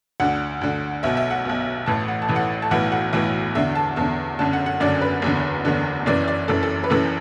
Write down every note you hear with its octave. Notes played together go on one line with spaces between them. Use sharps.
D2 D3 F#5
D2 D3
B1 B2 E5
E5
F#5
B1 B2
A1 A2 E3 A5
F#5
A5
A1 A2 E3
F#5
A5
B1 A2 E3 F#5
F#5
B1 A2 E3
E2 D3 E5
A5
E2 D3 A5
F#1 F#2 D3 A5
F#5
F#5
F#1 F#2 D3 D5
B4
F#1 E2 D3
F#1 E2 D3
F#1 F#2 E3 D5
D5
F#1 F#2 E3 A4
A4
B4
F#1 F#2 E3 A4